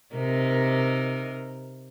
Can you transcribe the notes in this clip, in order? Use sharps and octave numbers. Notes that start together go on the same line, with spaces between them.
C3 D#4 A#4